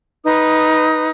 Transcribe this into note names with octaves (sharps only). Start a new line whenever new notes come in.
D#4 B4 D#6